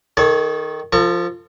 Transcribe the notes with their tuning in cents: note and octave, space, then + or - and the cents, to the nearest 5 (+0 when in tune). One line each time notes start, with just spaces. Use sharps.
D#3 +0 A4 -30 C#5 +25
F3 +0 A4 +45 C#6 +0